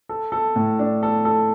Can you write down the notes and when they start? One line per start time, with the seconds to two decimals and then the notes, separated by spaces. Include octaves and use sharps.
0.09 A4
0.32 A4
0.56 A2
0.79 D4
1.03 A4
1.25 A4